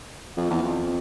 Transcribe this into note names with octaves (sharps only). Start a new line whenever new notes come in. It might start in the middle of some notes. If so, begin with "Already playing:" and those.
F2
E2
F2